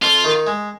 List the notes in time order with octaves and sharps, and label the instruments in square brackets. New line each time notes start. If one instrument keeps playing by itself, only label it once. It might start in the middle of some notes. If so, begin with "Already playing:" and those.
[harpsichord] F2 [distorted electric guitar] F4
[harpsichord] D#3
G#3